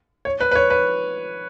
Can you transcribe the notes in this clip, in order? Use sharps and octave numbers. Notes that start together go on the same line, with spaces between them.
C#5
B4
B4
C#5
B4